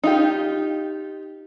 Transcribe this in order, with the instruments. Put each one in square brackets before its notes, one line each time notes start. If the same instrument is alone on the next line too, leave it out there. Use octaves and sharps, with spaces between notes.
[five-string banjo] D#4 F4 G4